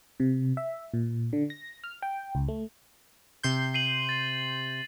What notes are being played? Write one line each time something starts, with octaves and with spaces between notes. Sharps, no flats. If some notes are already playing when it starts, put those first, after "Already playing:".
C3
E5
A#2
D3
A#6
F6
G5
C#2
A3
C3 C6 G6
C7 D#7 F#7
A6